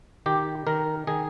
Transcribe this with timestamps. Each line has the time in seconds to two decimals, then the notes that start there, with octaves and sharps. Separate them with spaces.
0.26 D#3 G4
0.67 D#3 A#4
1.07 D#3 G#4